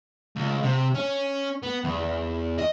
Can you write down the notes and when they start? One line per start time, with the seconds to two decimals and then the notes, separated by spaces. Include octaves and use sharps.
0.36 C#2
0.63 C3
0.95 C#4
1.63 B3
1.84 E2
2.59 D#5